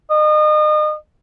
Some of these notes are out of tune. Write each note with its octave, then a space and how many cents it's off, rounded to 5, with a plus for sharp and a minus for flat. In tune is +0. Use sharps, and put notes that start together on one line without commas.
D#5 -35